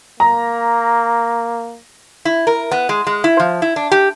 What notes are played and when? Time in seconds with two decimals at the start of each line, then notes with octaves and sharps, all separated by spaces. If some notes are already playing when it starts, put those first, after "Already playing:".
0.20 A#3 A#5
2.25 E4
2.47 A#4
2.71 B3
2.89 G#3
3.07 G#3
3.24 E4
3.40 F3
3.62 E4
3.76 D4
3.91 G4